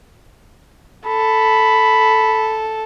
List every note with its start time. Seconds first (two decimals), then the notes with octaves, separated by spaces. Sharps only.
1.06 A4 B5